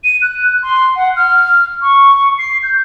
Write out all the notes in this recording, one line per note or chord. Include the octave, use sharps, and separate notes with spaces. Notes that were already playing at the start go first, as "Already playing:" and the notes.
D#7
F#6
C6
F#5
F6
C#6
C7
G6